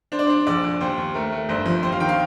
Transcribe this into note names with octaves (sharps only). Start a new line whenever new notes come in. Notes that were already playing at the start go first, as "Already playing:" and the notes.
D4 C5
D5
D4 C5
A#1 D5
A#1
D#2 C5
D#2
A3 A#4
A3
G1 C5
F3
D#2 C5
F5
D#3 G5
F5